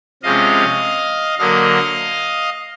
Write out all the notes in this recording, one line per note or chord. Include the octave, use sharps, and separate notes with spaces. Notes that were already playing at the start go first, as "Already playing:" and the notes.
C3 F3 G#3 C#4 D#5 F5
D3 F#3 A#3 D#5 F5